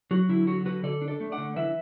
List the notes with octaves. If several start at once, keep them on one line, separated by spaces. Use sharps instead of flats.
F#3 F#4
D3 E4
F#3 F#4
D3 F#4 B4
D3 A4 D5
D4
A4 D5
A3
D5 F#5
D3
E3 B4 E5